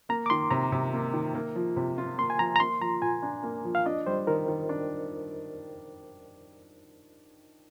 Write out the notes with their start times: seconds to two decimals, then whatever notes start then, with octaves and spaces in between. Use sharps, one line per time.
0.09 A#3 A#5
0.26 D6
0.30 D#3 C6
0.51 C3 A#5
0.72 C3
0.93 A#3
1.14 D#3
1.35 A#3
1.55 F3
1.76 C3
1.98 F4
2.18 A#3 C6
2.30 G#5
2.39 F3 A#5
2.56 A#5
2.60 A#3 C6
2.81 F3 A#5
3.02 A#2 G#5
3.22 D4
3.43 A#3
3.65 F3
3.75 F5
3.86 D4 D#5
4.07 G3 C5
4.27 D#3 A#4
4.48 D#3
4.69 D4